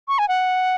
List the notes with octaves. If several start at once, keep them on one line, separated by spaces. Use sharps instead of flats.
C#6
G#5
F#5